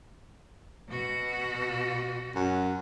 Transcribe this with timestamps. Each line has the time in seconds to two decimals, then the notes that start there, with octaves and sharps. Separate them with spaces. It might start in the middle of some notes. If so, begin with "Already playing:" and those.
0.88 B2 F#4
2.35 F#2